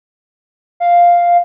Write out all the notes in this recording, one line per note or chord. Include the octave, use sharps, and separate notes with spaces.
F5